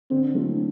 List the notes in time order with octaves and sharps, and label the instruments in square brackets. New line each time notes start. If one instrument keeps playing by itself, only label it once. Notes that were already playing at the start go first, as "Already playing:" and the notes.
[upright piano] D3 [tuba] C4
[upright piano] F#3 A3 C4 E4